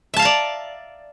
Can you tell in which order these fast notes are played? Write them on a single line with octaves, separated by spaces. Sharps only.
E5 A5 F5 A#5 D5